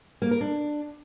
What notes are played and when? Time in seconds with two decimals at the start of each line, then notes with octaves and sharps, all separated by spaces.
0.22 A#3
0.31 A#4
0.41 D4